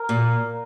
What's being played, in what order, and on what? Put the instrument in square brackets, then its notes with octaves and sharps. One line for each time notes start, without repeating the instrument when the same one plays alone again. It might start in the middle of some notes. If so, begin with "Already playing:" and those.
Already playing: [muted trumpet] A#4
[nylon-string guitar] A#2